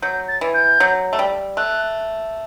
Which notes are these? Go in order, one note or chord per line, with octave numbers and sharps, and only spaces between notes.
F#3 G6
A6
E3
G6
F#3
A3
G3
A3 F#6